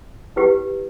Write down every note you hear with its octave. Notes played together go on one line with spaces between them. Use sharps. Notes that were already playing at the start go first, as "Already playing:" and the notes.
E4 G4 B4